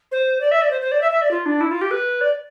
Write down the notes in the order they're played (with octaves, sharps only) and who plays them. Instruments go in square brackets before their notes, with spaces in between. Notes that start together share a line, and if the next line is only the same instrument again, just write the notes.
[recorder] C5
D5
E5
D5
C5
C5
D5
E5
E5
D5
F4
D4
E4
F4
G4
B4
D5